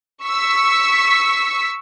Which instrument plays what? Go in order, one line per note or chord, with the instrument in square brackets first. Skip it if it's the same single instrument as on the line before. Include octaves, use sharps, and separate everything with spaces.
[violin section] C#6 E6 B6 C#7